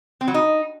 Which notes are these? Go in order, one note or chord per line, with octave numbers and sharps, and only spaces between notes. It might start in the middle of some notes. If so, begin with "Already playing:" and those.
C4
F#3
D#4